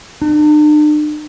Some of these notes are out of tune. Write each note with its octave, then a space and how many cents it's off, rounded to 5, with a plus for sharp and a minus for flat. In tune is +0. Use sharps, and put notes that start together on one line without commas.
D4 +45